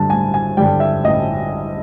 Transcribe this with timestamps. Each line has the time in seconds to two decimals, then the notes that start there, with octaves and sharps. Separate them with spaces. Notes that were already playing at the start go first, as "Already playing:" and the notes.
Already playing: G2 D3 G3 A5
0.10 A1 G#5
0.34 G#5
0.57 G2 D3 G3 G5
0.80 E5
1.04 A1 D#5